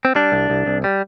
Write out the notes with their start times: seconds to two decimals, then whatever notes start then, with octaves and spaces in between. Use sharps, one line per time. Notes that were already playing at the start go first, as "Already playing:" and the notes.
0.05 C4
0.15 G3 D4
0.32 C2
0.50 C2
0.66 C2
0.84 G3